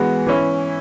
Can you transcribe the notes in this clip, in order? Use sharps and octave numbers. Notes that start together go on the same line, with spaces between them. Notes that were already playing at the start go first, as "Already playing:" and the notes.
Already playing: E3 G#3 B3 F#4
E3 C#4 E4